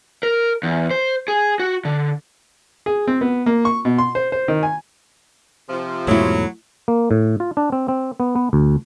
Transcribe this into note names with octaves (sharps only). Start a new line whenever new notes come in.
A#4
E2
C5
G#4
F#4
D3
G#4
C4
B3
A#3
C#6
B2
C6
C5
C5
D#3
G#5
C3 F3
E2 G#2 B2 F#3 A3 E4
A#3
A2
F4
D4
C4
C4
B3
B3
D2